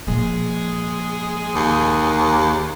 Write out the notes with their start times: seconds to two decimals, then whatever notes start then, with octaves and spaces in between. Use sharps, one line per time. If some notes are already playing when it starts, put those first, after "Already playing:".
0.07 A#2 F3 G#3 G#4
1.56 D#2